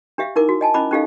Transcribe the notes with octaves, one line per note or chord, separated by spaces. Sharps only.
D4 G4 E5 F5
D#4 E4 A#4 D6
F#4
D#5 G#5 A5
C#4 E4 D#5 B5 D6
C#4 D#4 G4 A4 D#5 F5